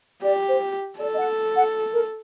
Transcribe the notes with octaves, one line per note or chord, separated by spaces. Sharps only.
G4 D5
C5
A4 D5
D#5
F#5
F#5
A#4